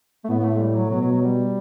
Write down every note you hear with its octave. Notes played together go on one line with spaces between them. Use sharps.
A3
A2 B3
B3
A3
G3
F#3
B2 F#3
F#3
F#3
G3